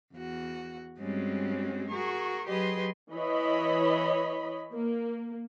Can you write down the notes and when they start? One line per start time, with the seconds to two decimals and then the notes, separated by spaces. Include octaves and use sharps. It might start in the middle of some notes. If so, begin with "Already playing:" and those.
0.16 E2 F#4
1.00 G2 G3 G#3 C4 C#4 F#4
1.91 F#4 G#4 A#4 C#6
2.48 F#3 G4 G#4 B4 D#5 C6
3.12 E3 C#5 D#5 B5
4.73 A#3